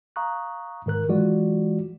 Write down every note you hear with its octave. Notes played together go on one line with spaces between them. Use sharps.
F5 A#5 C#6 D#6 F#6
G#2 D#3 A#4 F#6
E3 F#3 G#3 F4 F#4 D5